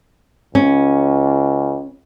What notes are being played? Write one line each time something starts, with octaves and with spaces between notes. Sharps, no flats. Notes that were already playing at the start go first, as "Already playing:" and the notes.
C#2 C#4